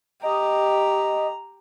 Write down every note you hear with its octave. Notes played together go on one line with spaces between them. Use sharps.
G4 D#5 A#5